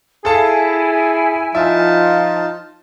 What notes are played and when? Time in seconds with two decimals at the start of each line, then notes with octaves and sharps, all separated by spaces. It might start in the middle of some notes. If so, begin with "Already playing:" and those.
0.25 E4 G#4 A4 F5 G#5 A5
1.55 F3 D#4 F4 E5 A5